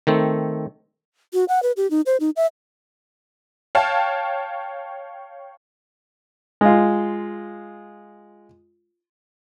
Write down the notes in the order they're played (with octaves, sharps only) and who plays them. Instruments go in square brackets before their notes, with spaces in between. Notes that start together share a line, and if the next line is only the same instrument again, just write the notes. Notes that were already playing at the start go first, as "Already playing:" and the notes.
[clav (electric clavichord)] D#3 A3 C4
[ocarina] F#4
F#5
B4
G4
D#4
C5
D#4
E5
[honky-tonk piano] C#5 F5 G5 A5
[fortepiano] G#3 F4